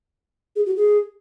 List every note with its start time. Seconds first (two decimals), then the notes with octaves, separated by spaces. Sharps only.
0.56 G#4
0.66 F#4
0.76 G#4